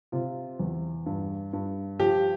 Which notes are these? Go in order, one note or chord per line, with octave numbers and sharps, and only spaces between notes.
C3 F4
E2
G2
G2
F3 G4